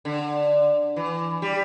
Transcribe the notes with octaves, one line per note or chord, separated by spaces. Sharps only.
D3
E3
G3